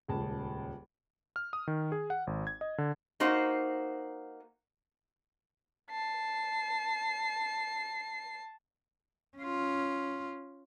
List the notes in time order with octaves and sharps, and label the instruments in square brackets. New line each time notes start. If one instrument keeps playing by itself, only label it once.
[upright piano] D#1 C#2 A5
[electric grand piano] F6
D#6
D#3
G#4
F#5
G#1
G#6
D#5
D3
[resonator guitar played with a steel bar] A#3 D#4 F#4 C5
[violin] A5 C7
[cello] C#4 F4